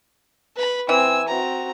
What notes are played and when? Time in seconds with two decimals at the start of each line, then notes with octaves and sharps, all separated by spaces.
0.56 B4 B5
0.89 E3 C4 G#5 E6
1.28 C4 F#4 A#5